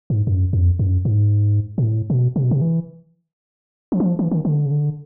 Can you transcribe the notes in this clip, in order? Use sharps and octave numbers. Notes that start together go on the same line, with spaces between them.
G#2
F#2
F2
F#2
G#2
A#2
A2
B2
C3
B2
C3
E3
F3
F#3
F3
E3
D#3
D3
C#3
D3